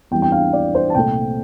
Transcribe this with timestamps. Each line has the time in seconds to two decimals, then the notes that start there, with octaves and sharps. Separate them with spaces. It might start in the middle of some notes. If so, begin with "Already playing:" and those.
0.11 E2 E3 G3 C4 G5
0.22 G5
0.32 F5
0.53 D5
0.75 C5
0.90 A5
0.95 C2 A#2 A3 G5